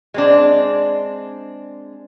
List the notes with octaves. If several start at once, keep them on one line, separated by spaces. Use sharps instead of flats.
G#3 C4 D4